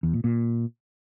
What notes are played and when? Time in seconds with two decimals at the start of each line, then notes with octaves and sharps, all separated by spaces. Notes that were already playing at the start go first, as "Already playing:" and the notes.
0.03 E2
0.14 A#2
0.24 A#2